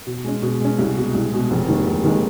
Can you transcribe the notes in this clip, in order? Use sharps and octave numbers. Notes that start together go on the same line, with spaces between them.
B2
G#3 C#4
B2
G#3 C#4
C2
B2 G#3
C2
B2 G#3
F1
D#2 D#3 G#3
F1
D#2 D#3 G#3